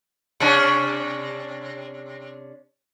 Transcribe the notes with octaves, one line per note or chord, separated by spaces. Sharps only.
C3 C#4 D4